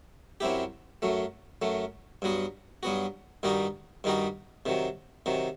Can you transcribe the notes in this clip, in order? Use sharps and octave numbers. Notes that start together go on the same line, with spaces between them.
F#2 F#3 C4 E4 G4
F#2 F#3 A3
F#2 F#3 A3
G2 F#3 B3 F#4
G2 F#3 B3 F#4
G2 D#3 G3 D#4 F#4
G2 D#3 G3 D#4 F#4
C3 D#3 F#3
C3 D#3 F#3